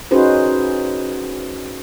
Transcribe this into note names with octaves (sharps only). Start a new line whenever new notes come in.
C#4 D#4 F#4 G#4 B4 C5